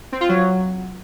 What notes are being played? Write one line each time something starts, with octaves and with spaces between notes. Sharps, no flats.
C4
F4
F#3